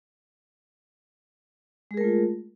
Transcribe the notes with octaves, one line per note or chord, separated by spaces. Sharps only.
G#3 A3 F4 G#4 A#4